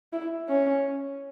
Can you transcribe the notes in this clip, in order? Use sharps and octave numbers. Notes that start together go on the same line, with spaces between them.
E4
C#4